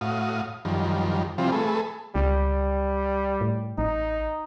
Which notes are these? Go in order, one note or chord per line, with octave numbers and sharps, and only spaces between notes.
A2 F#4 F5 D#6
F#2 D#3 F3 G3
C3 E3 F3 G3 C4 F4
A3 G#4 A4 B4
C#2 G3
A2
A1 D#4